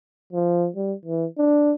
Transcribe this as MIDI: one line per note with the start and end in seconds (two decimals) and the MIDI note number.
0.33 0.68 53
0.76 0.94 55
1.06 1.26 52
1.38 1.74 62